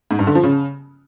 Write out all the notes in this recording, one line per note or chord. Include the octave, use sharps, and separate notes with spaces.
G#2
G2
D3
F3
C#3